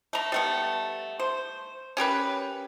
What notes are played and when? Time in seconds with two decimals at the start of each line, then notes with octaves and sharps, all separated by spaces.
0.13 A3 A#5
0.32 G3 A3 B3
1.19 C5
1.97 C#4 G4 A#4 B4